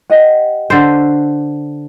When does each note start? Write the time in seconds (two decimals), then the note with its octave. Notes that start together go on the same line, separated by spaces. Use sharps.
0.10 G4 D#5 F#5
0.70 D3 C5